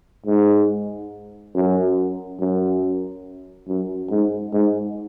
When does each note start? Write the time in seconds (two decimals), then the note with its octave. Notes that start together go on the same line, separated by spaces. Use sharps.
0.26 G#2
1.55 F#2
2.40 F#2
3.68 F#2
4.11 G#2
4.53 G#2